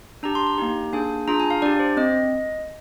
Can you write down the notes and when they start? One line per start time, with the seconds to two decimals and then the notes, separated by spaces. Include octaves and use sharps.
0.23 D4 G4 A#5
0.35 C6
0.47 A#5
0.58 A#3 D#4 G4
0.93 A#3 D4 G#4 G#5
1.28 D4 F4 G#4 A#5
1.40 G#5
1.50 F5
1.62 D4 G4 D5
1.79 C5
1.97 C4 D#5